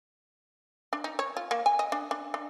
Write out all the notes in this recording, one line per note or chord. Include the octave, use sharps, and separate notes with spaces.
D4
D#4
C#5
F4
A#3
G#5
D#5
D4
D4
D4